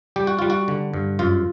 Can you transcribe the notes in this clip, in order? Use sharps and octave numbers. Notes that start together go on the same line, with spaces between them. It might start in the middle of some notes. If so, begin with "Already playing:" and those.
G3 G4
F#4
G3 F4
F#4
D3
G2
F#2 F4